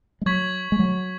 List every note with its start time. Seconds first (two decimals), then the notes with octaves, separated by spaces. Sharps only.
0.21 G#3
0.26 F#3 C#6 G#6 B6 F#7
0.72 G#3
0.79 F#3